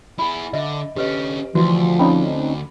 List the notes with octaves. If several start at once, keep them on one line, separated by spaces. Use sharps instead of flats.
E4 G#4 B5
D3 D#5 E5
D3 C#4 G4 B4 D#5
D2 E3 F3 F#4 C6
C4 C#4 D#4 B5